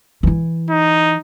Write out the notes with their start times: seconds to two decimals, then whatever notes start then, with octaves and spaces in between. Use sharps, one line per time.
0.23 E3 E4
0.70 D#4